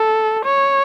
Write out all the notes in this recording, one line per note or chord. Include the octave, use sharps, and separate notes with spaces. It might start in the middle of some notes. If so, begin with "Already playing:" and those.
Already playing: A4
C#5